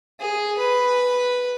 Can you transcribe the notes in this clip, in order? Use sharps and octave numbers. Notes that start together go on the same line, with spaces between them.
G#4
B4